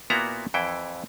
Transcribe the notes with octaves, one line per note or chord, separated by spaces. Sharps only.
A#2 A#3 B3 E4 F#4 A#5
F2 E3 E4 G5